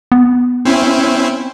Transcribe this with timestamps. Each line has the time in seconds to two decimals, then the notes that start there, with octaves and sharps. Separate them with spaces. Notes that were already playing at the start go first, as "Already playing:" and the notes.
0.12 B3
0.65 C4 C#4 E4